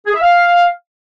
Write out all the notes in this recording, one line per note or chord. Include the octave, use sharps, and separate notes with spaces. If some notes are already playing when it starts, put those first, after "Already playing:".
G#4
E5
F5